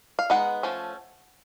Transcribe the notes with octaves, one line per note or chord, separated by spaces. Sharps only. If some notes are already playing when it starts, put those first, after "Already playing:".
F5
G#3 B3 D#4 F#5
F3 A3 C#4